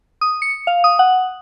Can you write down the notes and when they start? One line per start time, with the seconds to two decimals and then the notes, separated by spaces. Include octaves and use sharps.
0.21 D#6
0.42 C#7
0.67 F5
0.84 D#6
0.99 F#5